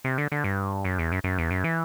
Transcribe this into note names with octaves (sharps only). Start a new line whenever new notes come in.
C3
D3
D3
G2
F#2
E2
F#2
F#2
E2
F#2
E3